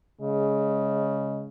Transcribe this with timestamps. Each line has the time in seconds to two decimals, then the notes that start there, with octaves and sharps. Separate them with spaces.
0.21 C#3 G#3